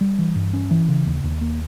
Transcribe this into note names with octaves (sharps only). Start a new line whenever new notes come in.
G3
E3
G2
C#4
E3
C#3
D#2
D#2
A#3